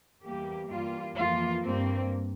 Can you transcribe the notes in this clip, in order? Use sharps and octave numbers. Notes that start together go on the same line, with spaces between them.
E2 E3 G3 A#3 G4
G2 E3 G3 A#3 F4
F2 E3 A#3 F4
G2 G3 A#3 C4